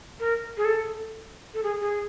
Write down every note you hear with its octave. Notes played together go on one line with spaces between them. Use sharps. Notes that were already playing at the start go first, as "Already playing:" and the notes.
A#4
G#4
A4
A4
G#4
G#4